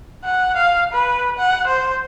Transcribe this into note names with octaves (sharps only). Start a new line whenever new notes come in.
F#5
F5
B4
F#5
C5